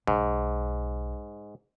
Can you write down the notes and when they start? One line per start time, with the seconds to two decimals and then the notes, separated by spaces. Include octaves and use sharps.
0.07 B1 G#2